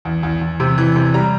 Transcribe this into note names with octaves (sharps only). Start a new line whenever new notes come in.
E2
E2
E2
C3
E3
C3
G3 A#5